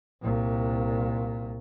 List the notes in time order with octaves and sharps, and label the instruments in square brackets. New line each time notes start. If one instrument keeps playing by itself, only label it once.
[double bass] C2 A#2